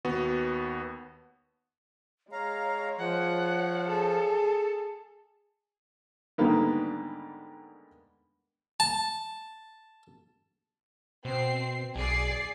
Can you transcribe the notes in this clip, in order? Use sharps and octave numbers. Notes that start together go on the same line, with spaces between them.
D#2 B3 F#4
G#3 C#5 F5 A#5
F3 F#5
G#4 A4
G#2 D3 D#3 G3 A#3 B3
A5
B2 C4 C7
B1 G#4 D5 C7